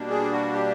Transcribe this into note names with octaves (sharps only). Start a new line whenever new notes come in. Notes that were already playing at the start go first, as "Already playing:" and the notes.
Already playing: B2 G3 A#3 D4
G#4
F#4
G4